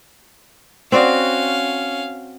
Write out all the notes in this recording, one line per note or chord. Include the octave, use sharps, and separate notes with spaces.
C4 C#4 F#4 D5 F5